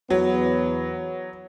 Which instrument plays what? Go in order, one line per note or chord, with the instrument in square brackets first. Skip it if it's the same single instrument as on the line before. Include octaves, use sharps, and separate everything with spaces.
[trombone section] E2 B3 [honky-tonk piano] F#3